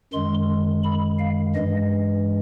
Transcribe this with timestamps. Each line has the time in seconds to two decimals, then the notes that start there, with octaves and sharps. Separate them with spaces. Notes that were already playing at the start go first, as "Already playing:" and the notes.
0.13 F#2 D#3 G#3 C6
0.83 B5
1.19 F5
1.55 G2 E3 G#3 D#5